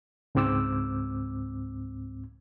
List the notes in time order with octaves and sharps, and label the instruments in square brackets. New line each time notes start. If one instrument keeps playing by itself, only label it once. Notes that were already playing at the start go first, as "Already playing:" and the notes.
[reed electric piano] C#2 G#2 C4 D6 E6